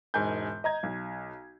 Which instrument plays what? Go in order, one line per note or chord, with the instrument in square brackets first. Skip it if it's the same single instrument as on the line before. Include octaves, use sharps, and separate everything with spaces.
[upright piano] E1 G#2 A#4 G#5 G6
D#5 A#5 G#6
B1